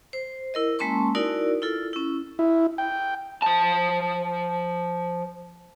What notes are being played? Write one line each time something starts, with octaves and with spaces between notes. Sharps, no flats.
C5
E4 A#4 D#5
G#3 A#3 C#4 A5 C6 C#6
D#4 E4 F#4 A#4 D5
E4 F4 A4
C#4 E4
E4
G5
F3 A5